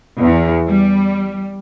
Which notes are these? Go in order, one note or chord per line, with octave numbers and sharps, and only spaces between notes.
E2
G3